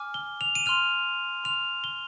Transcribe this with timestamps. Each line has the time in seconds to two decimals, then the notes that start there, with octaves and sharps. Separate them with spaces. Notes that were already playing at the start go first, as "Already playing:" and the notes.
Already playing: G#5 D6 F6
0.14 G7
0.41 F7
0.55 D#7
0.66 C6 F6 F7
1.44 C6 F6 F7
1.84 G7